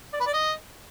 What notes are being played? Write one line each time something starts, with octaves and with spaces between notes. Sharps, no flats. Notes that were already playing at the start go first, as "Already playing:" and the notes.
D5
B4
D5
D#5